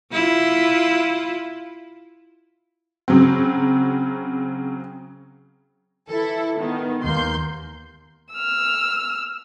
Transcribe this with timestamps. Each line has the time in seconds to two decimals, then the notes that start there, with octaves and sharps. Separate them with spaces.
0.12 E4 F4
3.08 C#3 F#3 C4
6.09 E3 E4 A4
6.59 D#3 B3
7.03 D#2 A#3 C6 G6
8.33 E6 F6